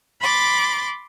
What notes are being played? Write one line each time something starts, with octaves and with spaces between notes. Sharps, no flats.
B5 C6 D6 A6